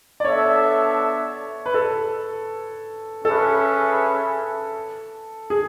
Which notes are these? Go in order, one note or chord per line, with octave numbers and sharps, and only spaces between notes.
D5
B3 D4 A4 C#5 E5
B4
A4
C#4 G#4 A4 B4 E5
G#4